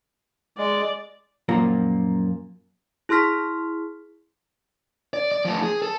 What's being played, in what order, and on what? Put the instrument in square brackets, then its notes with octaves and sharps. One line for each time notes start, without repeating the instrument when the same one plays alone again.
[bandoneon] G#3 [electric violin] D5
[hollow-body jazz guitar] F#2 A#2 F3 A#3 A#5
[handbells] E4 G#4 C6 F6 B6
[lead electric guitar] D5
D5
F3 A3
G#4
A4